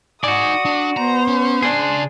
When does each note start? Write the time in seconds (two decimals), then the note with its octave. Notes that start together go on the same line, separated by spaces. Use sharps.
0.24 D#4 F#4 D5 G#5 D#6
0.65 D4
0.97 B3 C5 A#5
1.28 C#4
1.62 C#3 D4 G#4 C6